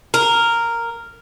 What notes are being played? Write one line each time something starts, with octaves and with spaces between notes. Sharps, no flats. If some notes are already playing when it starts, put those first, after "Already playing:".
A#4